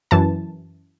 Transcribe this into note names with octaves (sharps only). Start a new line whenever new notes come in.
F#2 E3 A5